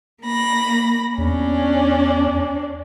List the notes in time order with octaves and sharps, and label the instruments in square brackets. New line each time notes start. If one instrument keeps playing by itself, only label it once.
[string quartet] A#3 B5 A#6
[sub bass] E2 [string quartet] C#4 D4